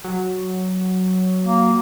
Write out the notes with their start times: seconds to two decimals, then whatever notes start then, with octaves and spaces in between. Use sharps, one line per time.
0.04 F#3
1.45 A#3